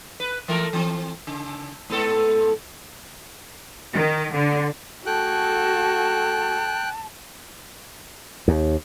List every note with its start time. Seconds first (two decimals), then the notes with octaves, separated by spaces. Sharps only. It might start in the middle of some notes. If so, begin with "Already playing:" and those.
0.20 B4
0.48 E3 A3 A#4
0.73 E3 C4
1.27 C#3
1.90 G#2 B3 A4
3.94 D#3
4.33 D3
5.06 A3 F#4 G#4 A4 G5 A5 F#6
8.48 D#2